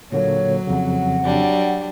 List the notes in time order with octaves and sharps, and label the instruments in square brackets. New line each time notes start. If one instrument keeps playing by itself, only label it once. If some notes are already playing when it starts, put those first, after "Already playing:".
[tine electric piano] A#2 D3 A#3 [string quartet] F#3 [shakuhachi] C#5
[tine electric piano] F2 C#3 [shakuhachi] F#5
[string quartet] F#3 G3 D4